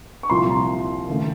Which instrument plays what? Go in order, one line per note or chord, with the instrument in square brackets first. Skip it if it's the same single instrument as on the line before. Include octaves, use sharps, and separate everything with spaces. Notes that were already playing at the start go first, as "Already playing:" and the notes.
[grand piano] C#6
C2 A#2 F3 C4 C6
A#5
D#2 C#3 A3